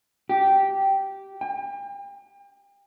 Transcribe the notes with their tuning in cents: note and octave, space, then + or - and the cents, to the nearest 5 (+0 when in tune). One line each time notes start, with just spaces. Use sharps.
G4 -10
G5 +40